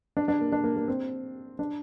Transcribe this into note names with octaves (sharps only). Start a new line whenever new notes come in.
D4
D4
A#3
D4
A#3
A#3
C4
D4